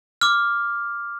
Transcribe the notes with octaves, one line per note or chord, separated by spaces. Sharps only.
D6 F6